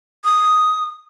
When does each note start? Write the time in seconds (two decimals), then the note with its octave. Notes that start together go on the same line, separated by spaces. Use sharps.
0.24 D#6